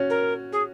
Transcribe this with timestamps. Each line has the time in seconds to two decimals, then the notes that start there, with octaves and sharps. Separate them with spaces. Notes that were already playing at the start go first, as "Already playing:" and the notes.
Already playing: C#4 F#4
0.10 A#4
0.52 G#4